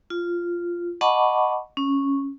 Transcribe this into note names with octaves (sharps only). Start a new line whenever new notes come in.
F4
D#5 F#5 A5 B5 C#6 D6
C#4